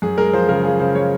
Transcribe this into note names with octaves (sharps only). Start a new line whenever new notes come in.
F#2 G#4
G#3 A#4
F3 C5
C#3 A#4
F3 G#4
C#3 C5
G#3 C#5